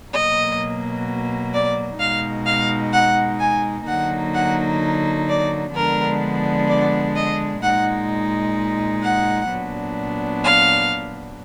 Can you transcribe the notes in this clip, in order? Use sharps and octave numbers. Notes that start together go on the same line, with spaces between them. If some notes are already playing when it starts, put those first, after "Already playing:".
B2 F#3 A#3 D#5
D5
B2 G#3 D#4 F5
F5
F#5
G#5
D3 F#3 A#3 D#4 F#5
F#5
D5
D3 F3 G#3 B3 D4 A#4
D5
D#5
A#2 G#3 D#4 F#5
F#5
A#2 F#3 B3 D4
F5